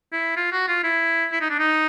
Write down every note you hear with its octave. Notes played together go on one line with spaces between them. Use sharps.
E4
F4
F#4
F4
E4
E4
D#4
D4
D#4